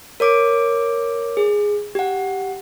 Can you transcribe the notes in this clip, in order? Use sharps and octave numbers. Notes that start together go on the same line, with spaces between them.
A#4 C#5 D6 D7
G#4
G4 F#5